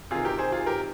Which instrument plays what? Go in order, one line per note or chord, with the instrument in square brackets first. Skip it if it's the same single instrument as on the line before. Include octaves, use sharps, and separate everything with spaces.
[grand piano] C3 D#3 F4 G#4
G4 A#4
G#4 C5
F4 G#4
G4 A#4